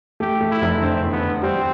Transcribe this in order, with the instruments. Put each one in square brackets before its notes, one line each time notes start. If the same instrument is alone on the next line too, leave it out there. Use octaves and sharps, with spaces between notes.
[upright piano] A3 [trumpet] G4
[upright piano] A3
[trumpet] E4
[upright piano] F1
[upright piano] D3 [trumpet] C4
[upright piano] E2
[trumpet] B3
[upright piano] D3
[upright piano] G3 [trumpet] C4